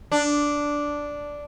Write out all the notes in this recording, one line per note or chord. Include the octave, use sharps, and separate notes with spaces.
D4